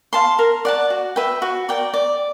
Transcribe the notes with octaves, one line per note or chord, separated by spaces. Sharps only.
F5 A5 C6
A#4
D5 F#5 A5
F#4
B4 E5 G5
F#4
A#4 D5 G5
D5